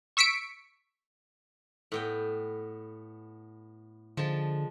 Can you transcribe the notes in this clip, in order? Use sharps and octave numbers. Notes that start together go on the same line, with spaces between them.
C#6 E6 B6 C#7 D7
A2 B3 G5
D3 F3 G#3 A5